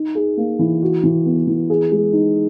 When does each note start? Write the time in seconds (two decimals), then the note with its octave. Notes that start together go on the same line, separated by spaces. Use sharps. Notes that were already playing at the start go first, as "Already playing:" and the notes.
Already playing: D#4
0.15 G#4
0.37 A#3
0.59 E3
0.82 F#4
1.03 E3
1.25 B3
1.47 E3
1.70 G#4
1.92 G#3
2.13 D#4